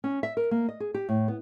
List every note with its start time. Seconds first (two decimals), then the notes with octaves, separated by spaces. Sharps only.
0.04 C#4
0.23 E5
0.37 A#4
0.51 A#3
0.69 D#5
0.80 G#4
0.94 G4
1.09 A2
1.28 B3